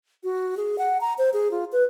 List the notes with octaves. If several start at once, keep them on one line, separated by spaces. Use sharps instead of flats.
F#4
G#4
F#5
A#5
C5
G#4
F4
B4